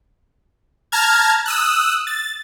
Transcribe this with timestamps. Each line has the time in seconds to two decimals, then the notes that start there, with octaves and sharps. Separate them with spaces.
0.92 A5 A#5 F6 G#6
1.46 D#6 E6 F#6
2.07 A6